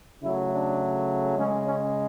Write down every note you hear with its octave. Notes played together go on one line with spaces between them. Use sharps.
C#3 F#3 A3 E4
D4
C#3 G#3 C#4
C#4